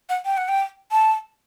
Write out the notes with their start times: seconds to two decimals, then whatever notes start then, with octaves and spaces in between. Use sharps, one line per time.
0.09 F#5
0.25 G5
0.37 F#5
0.48 G5
0.92 A5